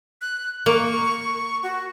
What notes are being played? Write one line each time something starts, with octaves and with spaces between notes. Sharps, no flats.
F#6
A#3 C#6
F#4